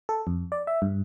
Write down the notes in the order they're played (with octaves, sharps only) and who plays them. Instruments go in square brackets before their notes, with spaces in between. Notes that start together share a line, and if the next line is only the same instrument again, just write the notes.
[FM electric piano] A4
F2
D5
E5
G2